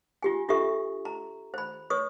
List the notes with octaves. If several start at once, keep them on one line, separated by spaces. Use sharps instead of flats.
F4 G4 G#5
D4 F4 G4 A4 E5 C#6
A#5
C5 B5
B4 C#5 C#6 D#6